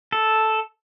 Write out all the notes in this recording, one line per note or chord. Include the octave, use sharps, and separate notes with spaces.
A4